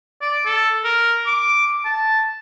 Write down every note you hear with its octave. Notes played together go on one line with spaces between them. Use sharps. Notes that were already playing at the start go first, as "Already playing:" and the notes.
D5
A4
A#4
D6
A5